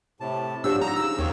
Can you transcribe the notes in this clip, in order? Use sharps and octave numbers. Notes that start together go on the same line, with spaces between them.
A2 C3 A5
F3 D4 F#4 G4 C#5 E6
D#4 A#5
C#3 E6
D#2 A#3 C4 C#5